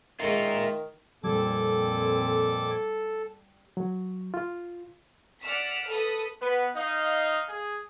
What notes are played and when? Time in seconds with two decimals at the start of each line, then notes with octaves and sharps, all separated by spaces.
0.20 D#3 G#3 C#4 F4 A#4 E5
1.23 F2 A#2 G3 C4 A4 D6 G#6
3.77 F#3
4.34 F4
5.42 D5 F#5 E6 F6 B6
5.89 A4 B4 D#6 B6
6.41 B3 B4
6.76 D#4 D#5 F5
7.49 G#4